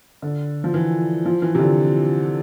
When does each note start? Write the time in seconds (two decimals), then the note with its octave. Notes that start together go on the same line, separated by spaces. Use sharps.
0.22 D3
0.64 F3
0.74 E3
1.26 F3
1.42 E3
1.55 C3
1.59 D3